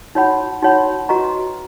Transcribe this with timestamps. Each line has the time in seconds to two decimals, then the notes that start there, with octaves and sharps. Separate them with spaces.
0.15 D#4 F#4 C#5 F#5 B5
0.62 D#4 F#4 C#5 F#5 B5
1.09 F#4 B4 D#5 A#5 C#6